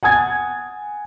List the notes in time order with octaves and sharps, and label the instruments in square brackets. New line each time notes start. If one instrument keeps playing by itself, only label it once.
[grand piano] F#5 G#5 D#6 G#6 A6